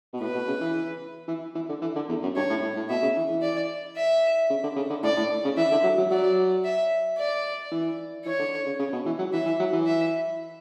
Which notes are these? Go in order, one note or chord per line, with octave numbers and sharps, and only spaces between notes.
B2
A2 B4
B2
C#3
E3
E3
E3
D3
E3
D3
E2
F#2
G2 C#5
A2
A2
A2
B2 E5
C#3
E3
E3
D5
E5
C#3
D3
C#3
D3
A2 D5
A2
C#3
E3 E5
D3
F#3
F#3
F#3 D5
E5
D5
E3
E3 C#5
D3
C#3
C#3
B2
E3
F#3
E3 E5
E3
F#3
E3
E5